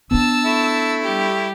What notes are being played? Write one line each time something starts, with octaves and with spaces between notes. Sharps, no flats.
B3 D4 A5 E6
A3 E4
G3 G4